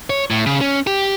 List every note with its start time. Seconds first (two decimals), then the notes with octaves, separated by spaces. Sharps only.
0.10 C#5
0.30 A2
0.46 C#3
0.61 C#4
0.87 G4